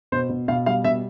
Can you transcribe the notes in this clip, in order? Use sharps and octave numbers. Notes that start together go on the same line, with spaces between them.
B2 C5
B2
B2 F5
G3 F5
B2 E5